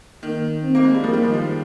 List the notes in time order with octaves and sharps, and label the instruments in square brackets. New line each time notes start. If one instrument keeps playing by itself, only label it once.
[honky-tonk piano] D#3 [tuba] A#3
[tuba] C4
[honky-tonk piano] A#3
G#3
G3
[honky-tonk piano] F3 [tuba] A#3
[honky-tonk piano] D#3 G3
F3 G#3
F3 G#3